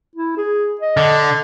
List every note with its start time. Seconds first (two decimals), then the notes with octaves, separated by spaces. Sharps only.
0.16 E4
0.37 G#4
0.81 D#5
0.97 D3